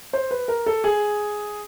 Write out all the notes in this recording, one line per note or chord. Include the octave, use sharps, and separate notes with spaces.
C5
B4
A#4
A4
G#4